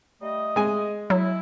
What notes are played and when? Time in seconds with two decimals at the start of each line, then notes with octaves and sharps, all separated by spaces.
0.22 G3 A3 D#5
0.56 G#3 G#5
1.10 F#3 E4